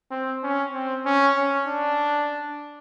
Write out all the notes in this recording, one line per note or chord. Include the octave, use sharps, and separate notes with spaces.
C4
C#4
C4
C#4
C#4
D4